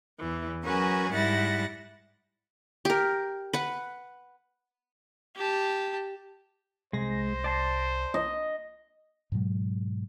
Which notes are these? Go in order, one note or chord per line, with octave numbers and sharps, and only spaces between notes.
E2 E3
F#3 C#4 F#4 G#4 A#4 B4
G#2 G3 E4 F#5 A6 A#6
G4 A#4
B4 F#5
G4 A5
C2 G#3 C5 A#6
D5 A5 C6
D#5
G#2 B2 F#3 G#3